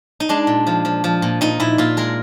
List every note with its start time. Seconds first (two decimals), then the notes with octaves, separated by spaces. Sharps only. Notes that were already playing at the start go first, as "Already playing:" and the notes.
0.20 D#4
0.29 G#3 D4
0.47 A#2
0.67 F3
0.85 F3
1.04 F3
1.22 A#2
1.41 A#2 D#4
1.60 A#2 E4
1.78 A#2 F4
1.97 G#3 A#4